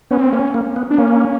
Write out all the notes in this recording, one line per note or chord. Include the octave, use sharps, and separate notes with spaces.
B3 C#4
C4
A#3 C#4
A#3
B3
D4
A#3 C#4